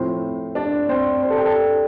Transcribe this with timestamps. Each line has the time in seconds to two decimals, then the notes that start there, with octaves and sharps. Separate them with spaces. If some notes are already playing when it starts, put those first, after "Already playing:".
Already playing: A2 F3 C4 C5
0.55 D4 D5
0.89 C4 C5
1.22 C5
1.30 A4
1.38 G4
1.45 A4